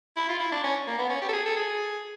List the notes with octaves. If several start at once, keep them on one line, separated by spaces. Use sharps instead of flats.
E4
F4
E4
D4
C#4
A#3
B3
C#4
G4
A4
G#4
A4
G#4